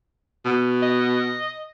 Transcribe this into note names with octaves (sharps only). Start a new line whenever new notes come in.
B2
D#5